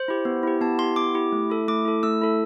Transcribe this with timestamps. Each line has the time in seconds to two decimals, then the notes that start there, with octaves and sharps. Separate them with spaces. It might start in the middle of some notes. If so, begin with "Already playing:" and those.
Already playing: C5
0.08 E4 G4
0.25 B3
0.43 E4 G4
0.61 B3 A5
0.79 E4 G4 C6
0.96 B3 D6
1.14 E4 G4
1.32 A3
1.50 E4 A4
1.68 A3 D6
1.85 E4 A4
2.03 A3 E6
2.21 E4 A4